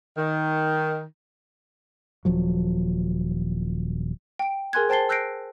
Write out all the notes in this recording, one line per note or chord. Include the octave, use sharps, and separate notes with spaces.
D#3
D#1 F3 F#3
G5 D7
G#4 A#4 G#5 C6 F#6 G#6
C5 G5 A5 A6 C7 G7
E6 F#6 G6 A#6 C7 D7